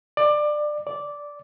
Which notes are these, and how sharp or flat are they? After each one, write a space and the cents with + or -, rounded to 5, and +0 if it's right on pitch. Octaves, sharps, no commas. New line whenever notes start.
D5 +20
D5 -10